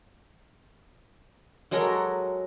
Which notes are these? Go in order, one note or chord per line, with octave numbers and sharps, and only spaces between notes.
F#3 G#3 A4 A#4